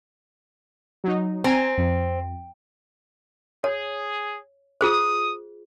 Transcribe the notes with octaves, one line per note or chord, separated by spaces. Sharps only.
F#3 D#4
C4 G#5 A#5
F2
G#4 C#5
F4 G#4 C5 D#6